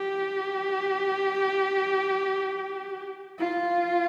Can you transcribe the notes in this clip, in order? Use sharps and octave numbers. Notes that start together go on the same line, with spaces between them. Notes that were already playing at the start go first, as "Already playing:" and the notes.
Already playing: G4
F4